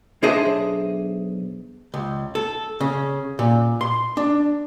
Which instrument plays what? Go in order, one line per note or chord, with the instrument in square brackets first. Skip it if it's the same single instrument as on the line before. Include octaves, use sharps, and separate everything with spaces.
[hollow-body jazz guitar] B1 D4 G#4 C5 D#5 E5
C#2
A4
C#3
A#2
C6
D4